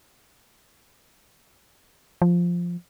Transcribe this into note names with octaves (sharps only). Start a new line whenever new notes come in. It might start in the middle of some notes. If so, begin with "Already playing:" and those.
F3